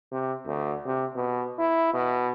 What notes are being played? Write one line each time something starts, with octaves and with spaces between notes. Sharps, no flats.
C3
D2
C3
B2
E4
B2